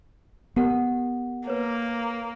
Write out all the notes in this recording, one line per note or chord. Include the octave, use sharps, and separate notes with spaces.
B3 G4 A#4 F#5
A#3 B4 C#5